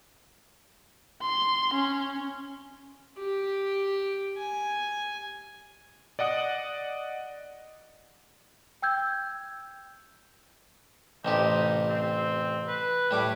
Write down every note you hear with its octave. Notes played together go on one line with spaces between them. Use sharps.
C6
C#4
G4
G#5
D5 D#5 F#5 D#6
G5 E6 G6 G#6
A1 C3 D#4 G4
C4
B4
A2 G3 D6